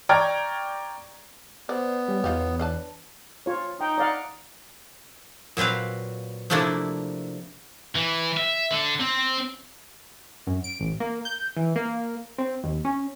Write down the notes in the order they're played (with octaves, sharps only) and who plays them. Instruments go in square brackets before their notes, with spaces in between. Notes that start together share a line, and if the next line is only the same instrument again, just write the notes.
[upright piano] D5 G5 A#5 C#6 F6 G#6
[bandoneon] B3 [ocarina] C5 [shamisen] D5
[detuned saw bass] G3 [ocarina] C#5
[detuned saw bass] E2 [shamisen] D#4 F4 G4
[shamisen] D4 B4 A5
[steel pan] F4 C#5
[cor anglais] D#4 [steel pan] G5
[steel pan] D5 F5 F#5
[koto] A#2 F#3 C4 B4 F5
C3 F3 A3 A#3 D4 E4
[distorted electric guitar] E3
E5
D3
C4
[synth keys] F#2
D7
A1
A#3
G6
E3
A#3
C4
D#2
C#4